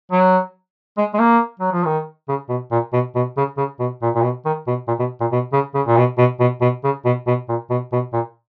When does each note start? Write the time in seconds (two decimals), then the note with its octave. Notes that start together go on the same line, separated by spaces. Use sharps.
0.11 F#3
0.97 G#3
1.14 G#3
1.19 A#3
1.60 F#3
1.72 F3
1.85 D#3
2.28 C#3
2.49 B2
2.72 A#2
2.93 B2
3.15 B2
3.37 C#3
3.57 C#3
3.79 B2
4.02 A#2
4.15 A#2
4.23 B2
4.45 D#3
4.67 B2
4.88 A#2
4.99 B2
5.21 A#2
5.32 B2
5.53 C#3
5.74 C#3
5.87 A#2
5.97 B2
6.18 B2
6.40 B2
6.61 B2
6.84 C#3
7.05 B2
7.27 B2
7.49 A#2
7.70 B2
7.92 B2
8.13 A#2